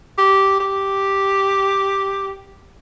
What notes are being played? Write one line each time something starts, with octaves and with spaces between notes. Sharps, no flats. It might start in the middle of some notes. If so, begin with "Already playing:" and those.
G4
G4